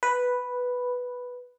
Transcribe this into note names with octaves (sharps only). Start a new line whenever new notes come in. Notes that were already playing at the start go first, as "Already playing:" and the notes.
B4